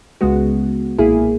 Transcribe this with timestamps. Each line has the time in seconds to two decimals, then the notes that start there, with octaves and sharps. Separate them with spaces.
0.21 C#2 C#3 G#3 B3 F#4
0.98 B1 A#2 A#3 E4 G#4